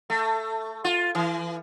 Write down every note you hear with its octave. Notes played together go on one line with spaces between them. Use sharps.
A3
F4
E3